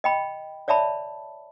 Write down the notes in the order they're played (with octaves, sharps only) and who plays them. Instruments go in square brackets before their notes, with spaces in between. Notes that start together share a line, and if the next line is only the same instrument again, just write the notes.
[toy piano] D#5 G5 B5
C#5 D5 E5 A5 B5